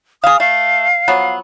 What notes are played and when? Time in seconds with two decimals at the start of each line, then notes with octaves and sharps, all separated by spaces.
0.24 G#4 F5 D#6
0.40 A3 F5
1.08 F3 F#3 B3